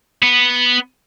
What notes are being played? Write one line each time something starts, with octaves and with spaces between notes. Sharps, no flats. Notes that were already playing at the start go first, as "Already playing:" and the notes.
B3